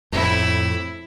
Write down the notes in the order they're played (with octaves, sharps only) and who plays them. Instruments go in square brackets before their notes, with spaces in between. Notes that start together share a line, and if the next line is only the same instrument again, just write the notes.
[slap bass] F2 A2 [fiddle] E4